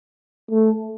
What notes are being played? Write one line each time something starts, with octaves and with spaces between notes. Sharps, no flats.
A3